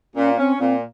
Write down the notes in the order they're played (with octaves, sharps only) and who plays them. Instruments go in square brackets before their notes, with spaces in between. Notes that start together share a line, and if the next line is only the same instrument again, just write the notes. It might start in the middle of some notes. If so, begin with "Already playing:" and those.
[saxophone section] A#2 [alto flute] C#4
[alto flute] C4 [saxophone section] C#4
[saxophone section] A#2 [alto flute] C4